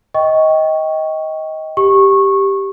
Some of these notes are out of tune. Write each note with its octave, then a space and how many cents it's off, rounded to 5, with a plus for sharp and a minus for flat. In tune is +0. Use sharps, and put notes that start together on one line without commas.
D#5 +20 G5 -5 C#6 +0
G4 +0 C#6 -20